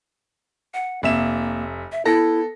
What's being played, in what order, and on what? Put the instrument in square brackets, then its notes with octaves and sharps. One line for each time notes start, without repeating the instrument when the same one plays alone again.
[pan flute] F#5
[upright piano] F1 E5 E7 [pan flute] A#3
[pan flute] E5
[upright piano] B3 A4 A#6 [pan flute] E4